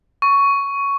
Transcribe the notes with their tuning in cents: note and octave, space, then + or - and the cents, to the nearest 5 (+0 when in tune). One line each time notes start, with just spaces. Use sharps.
C#6 +10